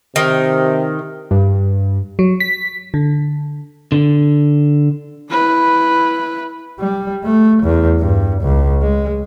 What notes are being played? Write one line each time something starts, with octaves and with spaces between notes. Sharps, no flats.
C3 D#3
G2
F#3
B6
D3
D3
E4 B4
G3
A3
E2
G2
C#2
G#3